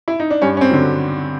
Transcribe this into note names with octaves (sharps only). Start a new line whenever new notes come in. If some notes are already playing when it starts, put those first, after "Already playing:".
E4
D#4
D4
G2 C#4
C#4
C4
D3 F#3